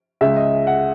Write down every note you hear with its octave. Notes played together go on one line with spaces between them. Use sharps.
C#2 C#3 G#3 E5
D#5
F#5